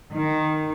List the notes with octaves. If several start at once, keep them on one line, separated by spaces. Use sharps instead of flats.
D#3